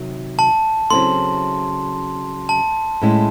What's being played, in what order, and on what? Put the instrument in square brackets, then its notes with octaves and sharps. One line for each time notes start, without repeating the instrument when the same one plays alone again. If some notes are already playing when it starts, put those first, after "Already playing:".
Already playing: [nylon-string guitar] C3 D#3 F#3
[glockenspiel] A5
[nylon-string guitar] C#3 F#3 C4 E4 A4 [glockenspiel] C6
[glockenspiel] A5
[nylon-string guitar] A2 G#3 C#4 E4